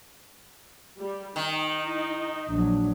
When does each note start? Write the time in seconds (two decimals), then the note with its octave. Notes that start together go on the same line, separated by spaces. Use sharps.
0.99 G3
1.36 D#3 D#4
1.85 E4
2.49 A#1 F#3 D4